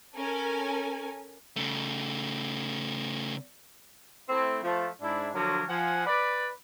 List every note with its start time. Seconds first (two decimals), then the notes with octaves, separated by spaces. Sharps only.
0.16 C#4 A4 A#4 G#5
1.56 C#3 A3
4.29 A3 C4 E4
4.64 F3 A3
5.02 G#2 D4 E4
5.34 D3 F3 F#3 D4 A#4 C#5
5.69 F3 F#5 G#5
6.06 B4 D5